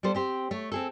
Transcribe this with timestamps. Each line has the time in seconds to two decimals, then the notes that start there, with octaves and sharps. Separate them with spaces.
0.03 G3 B3 A4 C5
0.15 C4 G4 C5
0.51 A3 C#5
0.72 C4 G#4 A4